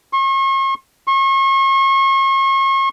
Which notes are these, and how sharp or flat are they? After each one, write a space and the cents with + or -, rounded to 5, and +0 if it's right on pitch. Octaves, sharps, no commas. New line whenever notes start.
C#6 -45
C#6 -40